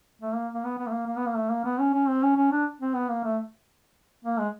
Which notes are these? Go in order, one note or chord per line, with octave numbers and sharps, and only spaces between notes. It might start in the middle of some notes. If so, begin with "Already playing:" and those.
A3
A#3
A#3
B3
B3
A3
A#3
A#3
B3
A#3
A3
A#3
B3
C#4
C#4
C4
C#4
C#4
D4
C4
B3
A#3
A3
A#3
G#3